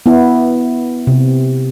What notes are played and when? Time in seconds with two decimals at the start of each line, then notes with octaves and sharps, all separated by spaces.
0.06 B3 E4
1.07 C3